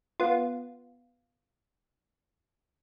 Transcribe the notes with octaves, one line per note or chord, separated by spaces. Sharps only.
B3 F4